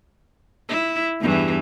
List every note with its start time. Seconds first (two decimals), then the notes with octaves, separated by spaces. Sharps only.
0.68 E4
1.20 E2 G2 E3